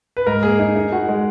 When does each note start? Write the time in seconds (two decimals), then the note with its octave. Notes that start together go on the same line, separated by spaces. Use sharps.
0.17 B4
0.26 G#2 A#4
0.43 A#3 G#4
0.59 D#4 G#4
0.76 D#4
0.92 F#4
1.08 G#3